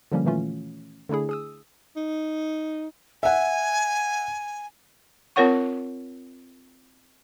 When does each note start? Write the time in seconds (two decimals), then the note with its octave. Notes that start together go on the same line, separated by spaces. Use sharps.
0.12 D3 F3 G3 A#3 C#4
0.25 A#2 D#3 E3 A3 C#4 F4
1.09 D3 A3 D4 E4 G#4
1.29 G#4 D#6 E6
1.96 D#4
3.23 E5 F#5 G#5
5.36 C4 F4 A#4 C#5 F#5 C#6